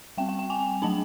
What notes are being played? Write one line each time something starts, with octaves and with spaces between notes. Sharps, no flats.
G3 C4 G5
G5
G5
G#5
F#3 A3 D4 A5